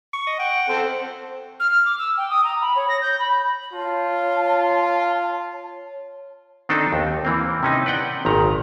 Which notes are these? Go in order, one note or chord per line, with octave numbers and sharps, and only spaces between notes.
C#6
D#5
F#5 G5
C4 A4 C5
F6
F6
D6
E6
G5
D#6
A#5
B5
C#5
A#6
G6
B5
F4 C#5 A5
D#3 C4 D4 D#4 A4
D#2
E3 A#3 C4
C3 C#4 D#4
B4 D5 F#5 G5
G#1 A#2 D#3 A#5